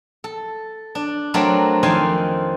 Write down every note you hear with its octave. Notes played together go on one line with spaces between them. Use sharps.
A4
D4
F#3 A3 C4 D4 A#4 D5
F2 D#3 C4 D5 F5 G#5